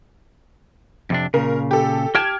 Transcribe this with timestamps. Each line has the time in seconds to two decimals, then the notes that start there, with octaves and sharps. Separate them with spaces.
1.10 F2 C3 D4
1.34 A#2 C#3 A#4
1.71 G4 A4
2.15 G4 G5 A5 F6 G#6